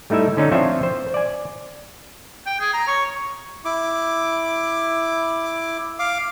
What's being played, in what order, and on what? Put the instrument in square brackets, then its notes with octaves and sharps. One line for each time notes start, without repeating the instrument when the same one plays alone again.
[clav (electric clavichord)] G3 A3 D#4 E4 E5
D3 C#4 D#4
F3 C4 D4 F4 C#5 E5
C5
D5 G#5
[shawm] G5
G#4
A#5
C#5
[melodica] E4 D6
F5 D6